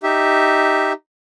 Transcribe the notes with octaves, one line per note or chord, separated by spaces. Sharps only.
D#4 G4 E5